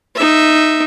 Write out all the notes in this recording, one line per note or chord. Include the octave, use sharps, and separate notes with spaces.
D#4 E5